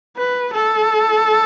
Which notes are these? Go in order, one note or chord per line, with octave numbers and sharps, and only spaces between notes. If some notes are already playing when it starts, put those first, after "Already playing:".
B4
A4